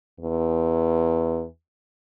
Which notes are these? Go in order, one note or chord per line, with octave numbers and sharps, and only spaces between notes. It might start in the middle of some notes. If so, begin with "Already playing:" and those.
E2